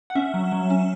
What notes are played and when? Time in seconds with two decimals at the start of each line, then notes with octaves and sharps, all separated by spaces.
0.10 F#5
0.15 C#4 E5
0.34 F#3
0.52 F#3
0.70 C#4